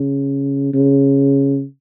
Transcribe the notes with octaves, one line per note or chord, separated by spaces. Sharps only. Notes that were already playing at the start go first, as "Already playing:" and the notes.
Already playing: C#3
C#3